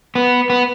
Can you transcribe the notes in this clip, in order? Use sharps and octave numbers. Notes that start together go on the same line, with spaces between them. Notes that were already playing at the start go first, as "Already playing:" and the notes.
B3
B3